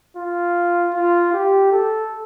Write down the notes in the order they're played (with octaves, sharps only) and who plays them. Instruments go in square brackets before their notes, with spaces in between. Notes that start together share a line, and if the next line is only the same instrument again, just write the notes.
[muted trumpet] F4
F4
G4
A4